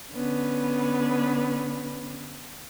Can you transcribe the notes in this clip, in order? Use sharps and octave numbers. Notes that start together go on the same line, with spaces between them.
D3 B3 C#4 B4